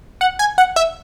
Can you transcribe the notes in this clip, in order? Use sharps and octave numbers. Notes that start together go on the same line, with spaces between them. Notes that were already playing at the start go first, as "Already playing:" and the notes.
F#5
G#5
F#5
E5